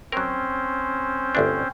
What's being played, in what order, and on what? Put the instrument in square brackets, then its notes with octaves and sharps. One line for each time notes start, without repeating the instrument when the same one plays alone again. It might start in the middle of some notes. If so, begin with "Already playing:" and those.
[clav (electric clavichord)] F#3 A#4 [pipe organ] C4 C#4 C5
[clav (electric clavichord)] G1 D2 D4